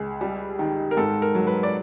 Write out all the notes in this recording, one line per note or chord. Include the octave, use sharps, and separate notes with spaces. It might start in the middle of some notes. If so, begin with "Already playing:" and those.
Already playing: C#2 G#4
G3
D#3
A#4
G#2 A4
A#4
F#3
B4
D5